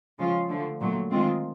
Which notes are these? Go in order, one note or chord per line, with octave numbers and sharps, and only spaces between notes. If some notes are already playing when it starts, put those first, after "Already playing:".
C#3 F3 G#3 C#4 F4
D3 F3 A3
A#2 F#3 A3
D#3 G#3 C4 F4